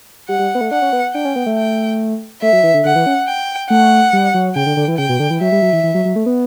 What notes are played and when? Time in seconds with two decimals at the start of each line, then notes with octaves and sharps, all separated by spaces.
0.29 G3 F#5
0.39 G3
0.55 B3
0.61 A3
0.71 D4 F#5
0.82 C#4
0.93 B3
1.14 D4 G5
1.25 C#4
1.36 B3
1.46 A3
1.57 G5
2.42 A3 E5
2.53 F#3
2.63 E3
2.74 D3
2.85 D3 F#5
2.96 E3
3.06 C#4
3.27 G5
3.70 A3 F#5
4.13 G3
4.34 F#3
4.56 C#3 G5
4.66 D3
4.77 D3
4.88 E3
4.98 C#3 G5
5.09 B2
5.20 D3
5.30 E3
5.40 F#3 E5
5.52 G3
5.62 F#3
5.73 E3
5.83 E3
5.94 F#3
6.05 F#3
6.16 A3
6.26 B3